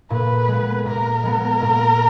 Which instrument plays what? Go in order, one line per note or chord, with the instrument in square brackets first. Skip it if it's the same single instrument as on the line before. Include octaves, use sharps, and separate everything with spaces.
[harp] A#2 [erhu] B4
[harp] G#3 B3
[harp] A#2 [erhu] A#4
[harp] G#3 B3
A#2